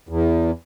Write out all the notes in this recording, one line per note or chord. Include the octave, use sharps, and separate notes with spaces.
E2